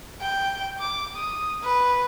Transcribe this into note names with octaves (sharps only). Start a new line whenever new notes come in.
G5
D6
D#6
B4